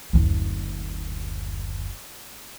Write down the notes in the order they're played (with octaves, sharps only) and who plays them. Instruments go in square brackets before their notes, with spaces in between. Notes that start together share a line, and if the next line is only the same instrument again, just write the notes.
[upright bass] F#1 D2